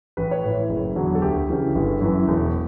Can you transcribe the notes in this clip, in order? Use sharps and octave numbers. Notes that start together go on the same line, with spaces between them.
A1 B4
C#5
A2 E3 B4
F#1
E2 D3 F#3
A4
D2 G4
C#3 E3
G1
F#2 E3
E1